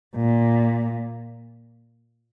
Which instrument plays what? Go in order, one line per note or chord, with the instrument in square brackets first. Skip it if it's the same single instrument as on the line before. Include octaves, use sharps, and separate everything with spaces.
[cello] A#2